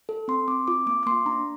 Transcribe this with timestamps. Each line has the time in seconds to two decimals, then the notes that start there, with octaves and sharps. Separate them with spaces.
0.09 A4
0.28 C4 C6
0.48 C4 D6
0.67 F4 D6
0.87 A#3 D6
1.03 D6
1.06 A#3 C6
1.26 D4 A#5